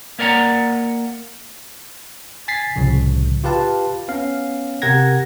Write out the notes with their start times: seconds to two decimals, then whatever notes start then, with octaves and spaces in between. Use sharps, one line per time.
0.19 A#3 A#4 D5 F#5 A#5
2.48 G#5 A6 B6 C7
2.76 C2 A2 C#3 F3
3.44 F4 G4 B4 F5 A5
4.08 B3 C#4 F5
4.82 C3 G4 A#4 F#5 G#6 A#6